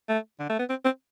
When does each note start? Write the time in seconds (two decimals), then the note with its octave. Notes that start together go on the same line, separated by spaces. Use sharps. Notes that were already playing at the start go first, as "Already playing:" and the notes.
0.09 A3
0.40 D3
0.49 A3
0.59 B3
0.70 C4
0.85 C4